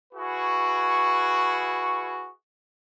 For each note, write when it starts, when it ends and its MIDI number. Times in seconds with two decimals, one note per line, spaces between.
0.14 2.29 64
0.14 2.29 66
0.14 2.29 68
0.14 2.29 71
0.14 2.29 85